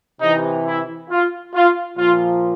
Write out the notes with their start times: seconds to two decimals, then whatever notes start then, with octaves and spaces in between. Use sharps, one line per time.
0.20 C3 E3 D#4
0.66 E4
1.10 F4
1.54 F4
1.98 A#2 F3 F4